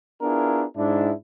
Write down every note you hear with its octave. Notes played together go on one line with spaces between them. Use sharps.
B3 D4 E4 F4 G#4 A#4
G#2 D4 E4